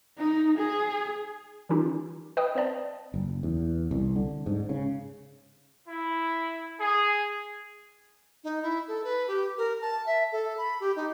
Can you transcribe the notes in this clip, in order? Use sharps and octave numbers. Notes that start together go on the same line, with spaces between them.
D#4
G#4
D#3 E3 C#4 D#4 F4 G4
B4 D#5 G5 B5 D#6
C4 C5 D5 A5
F#1
E2
C2
D3
G#2
C#3
E4
G#4
D#4
E4
A4
B4
G4
A#4
A5
E5
A4
B5
G4
D#4